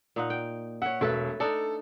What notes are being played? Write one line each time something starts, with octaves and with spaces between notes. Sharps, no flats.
A#2 D#4 F#5
G5
C#5 E5 F#5
E1 A3 A4 B4
D4 D#4 A4